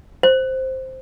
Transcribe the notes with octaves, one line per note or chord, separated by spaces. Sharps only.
C5